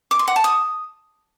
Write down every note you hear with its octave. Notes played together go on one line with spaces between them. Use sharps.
D6
C6
F#5
A5
D#6